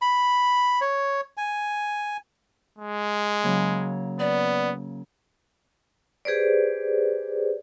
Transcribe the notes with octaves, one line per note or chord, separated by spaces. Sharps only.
B5
C#5
G#5
G#3
C#3 F#3 A#3
B3 D5
G4 G#4 B4 C5 D5